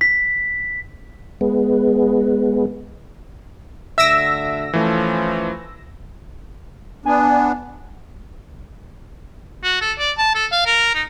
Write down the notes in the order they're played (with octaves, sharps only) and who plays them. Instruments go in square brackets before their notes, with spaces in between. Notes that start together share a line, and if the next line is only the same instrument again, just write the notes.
[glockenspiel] B6
[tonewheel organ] G#3 B3
[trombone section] D2 D3 [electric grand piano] E5 D7 [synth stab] E6 A#6
[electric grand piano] E3 A3 [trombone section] F3 C#4
[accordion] B3 D4 [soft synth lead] G#5
[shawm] F#4
A4
D5
A5
A4
F5
A#4
D#4